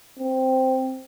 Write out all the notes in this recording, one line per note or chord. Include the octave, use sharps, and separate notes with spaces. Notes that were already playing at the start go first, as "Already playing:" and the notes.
C4